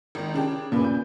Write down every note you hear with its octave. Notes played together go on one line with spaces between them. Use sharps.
G#1 D#3
C#3 D4 G4
D#2 A#2 C#3 B4
G6